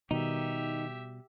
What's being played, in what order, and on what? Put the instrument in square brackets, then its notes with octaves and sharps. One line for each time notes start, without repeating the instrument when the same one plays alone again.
[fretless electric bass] B2 G3 [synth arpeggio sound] D#3 [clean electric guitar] D#4 [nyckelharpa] G4 E5